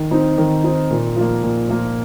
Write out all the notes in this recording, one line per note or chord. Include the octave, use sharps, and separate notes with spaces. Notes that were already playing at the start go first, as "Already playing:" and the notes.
Already playing: D#3
C4 D#4
D#3
C4 D#4
A#2
F3 A#3
A#2
F3 A#3